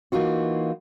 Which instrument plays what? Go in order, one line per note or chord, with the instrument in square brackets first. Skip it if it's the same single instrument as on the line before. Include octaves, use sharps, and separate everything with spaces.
[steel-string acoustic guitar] E3 A#3 D#4 F4 F#4